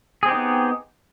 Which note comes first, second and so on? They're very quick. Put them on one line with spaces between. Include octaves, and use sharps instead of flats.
G#4 C4 G4 D#4 B3